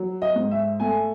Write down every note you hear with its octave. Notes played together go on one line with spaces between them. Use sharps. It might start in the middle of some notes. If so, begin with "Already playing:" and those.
Already playing: F#3
D#5
G#2
E5
A3 G#5